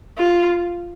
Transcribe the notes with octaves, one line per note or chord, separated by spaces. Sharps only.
F4